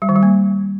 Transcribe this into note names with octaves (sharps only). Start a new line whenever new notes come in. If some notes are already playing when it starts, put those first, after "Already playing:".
G3
D#3
G3
A#3